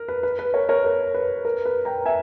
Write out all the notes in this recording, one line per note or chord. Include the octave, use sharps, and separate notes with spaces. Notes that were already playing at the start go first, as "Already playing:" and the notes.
Already playing: A#4
B4
B4
B4
A#4 C#5
A#4 C#5
A#4
B4
A#4
B4
G5 A#5
E5 G#5